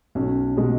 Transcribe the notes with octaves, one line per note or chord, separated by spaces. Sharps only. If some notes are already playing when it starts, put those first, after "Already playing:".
B1 C#4
B2 G#3